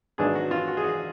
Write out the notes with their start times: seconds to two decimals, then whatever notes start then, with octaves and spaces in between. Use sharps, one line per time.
0.18 G#1 G#2 F#3 B3 D4 G#4
0.35 F#4
0.51 F4
0.68 F#4
0.77 G#4
0.84 F#4